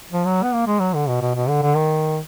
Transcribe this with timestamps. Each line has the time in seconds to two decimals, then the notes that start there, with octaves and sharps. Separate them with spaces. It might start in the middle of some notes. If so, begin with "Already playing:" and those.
0.12 F3
0.26 F#3
0.43 B3
0.54 A#3
0.67 G#3
0.80 F#3
0.95 D3
1.08 B2
1.21 B2
1.35 B2
1.49 D3
1.62 D3
1.76 D#3